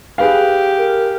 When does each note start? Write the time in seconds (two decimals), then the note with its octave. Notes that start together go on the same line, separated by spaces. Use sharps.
0.18 G4 G#4 B4 F5
0.77 A#4